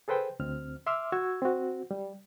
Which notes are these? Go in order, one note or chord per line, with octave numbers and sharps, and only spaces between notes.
G#4 A4 B4 C5 G5
D2 C4 F6
E5 C6 D6 E6 F6
F#4 C#6 E6 G#6
C4 F#4
G3